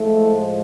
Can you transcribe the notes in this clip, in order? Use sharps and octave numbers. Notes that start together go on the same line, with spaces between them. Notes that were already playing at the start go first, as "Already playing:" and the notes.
Already playing: A2 F3 G#3 A3